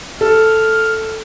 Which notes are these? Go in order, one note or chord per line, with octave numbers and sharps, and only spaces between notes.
A4 F6